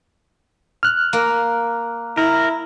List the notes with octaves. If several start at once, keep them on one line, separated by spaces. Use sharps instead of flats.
F6 F#6
A#3
E4 A#4